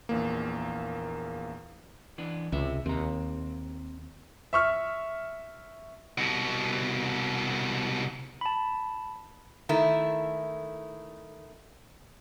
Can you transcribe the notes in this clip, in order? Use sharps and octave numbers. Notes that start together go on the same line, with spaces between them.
A#1 E2 A#3
E3 B3 D4
C#2 C3 E5
D#2 C4 A#5
E5 C#6 F6
C2 B2
A5 B5
D#3 A3 E4